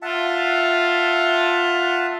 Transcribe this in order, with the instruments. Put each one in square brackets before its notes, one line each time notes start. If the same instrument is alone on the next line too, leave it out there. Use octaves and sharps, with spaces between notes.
[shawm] F4 [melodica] E5 F#5 A5